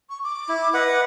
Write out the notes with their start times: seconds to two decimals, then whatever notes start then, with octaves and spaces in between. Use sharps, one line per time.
0.10 C#6
0.24 D6
0.49 E4
0.74 B4 D#5 F#5